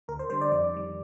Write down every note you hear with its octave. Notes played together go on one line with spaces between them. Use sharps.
D2 A#4
C5
D3 G3 C5
D5
F2 D5
D#3 G3